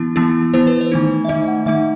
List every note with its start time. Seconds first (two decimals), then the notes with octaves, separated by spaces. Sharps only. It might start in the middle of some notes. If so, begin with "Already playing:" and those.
Already playing: E3 B3 E4
0.16 E3 B3 E4
0.54 E3 B3 E4 C5
0.67 B4
0.81 C5
0.92 D#3 A3 D#4
1.25 E5
1.28 D#3 A3 D#4 D#5
1.48 F#5
1.66 D#3 A3 D#4 E5